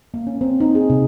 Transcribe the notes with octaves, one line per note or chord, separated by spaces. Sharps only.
A#3
C#4
C4
D#4
G#4
C3